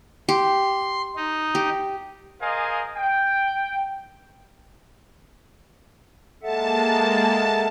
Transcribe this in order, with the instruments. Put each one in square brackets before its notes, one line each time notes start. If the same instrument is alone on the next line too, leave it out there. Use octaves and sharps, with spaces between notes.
[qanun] G4 [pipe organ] C6
[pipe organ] D#4
[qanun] G4
[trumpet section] G#4 A#4 C5 D#5 F5 G#5
G5
[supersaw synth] G#3 A#3 [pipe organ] A4 E5 F#5 [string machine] A5